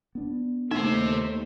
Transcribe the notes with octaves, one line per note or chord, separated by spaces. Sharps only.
B3 D4
D#2 A3 D#4 C5 E5